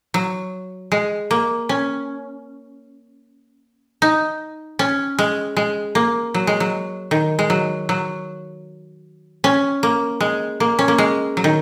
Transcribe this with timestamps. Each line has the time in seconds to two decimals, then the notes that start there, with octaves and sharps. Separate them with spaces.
0.14 F#3
0.92 G#3
1.31 A#3
1.69 C#4
4.02 D#4
4.79 C#4
5.19 G#3
5.57 G#3
5.95 A#3
6.34 F#3
6.47 G#3
6.60 F#3
7.11 D#3
7.39 G#3
7.50 F#3
7.89 F#3
9.44 C#4
9.83 A#3
10.20 G#3
10.60 A#3
10.79 C#4
10.88 A#3
10.98 G#3
11.37 F#3
11.44 D#3